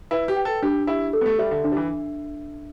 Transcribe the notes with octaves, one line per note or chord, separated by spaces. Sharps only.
E4 B4
G4
G5
A4
D4 G4
E4 G4
A4
B3
A3
G3 E5
D3
D3 D4
G3
E3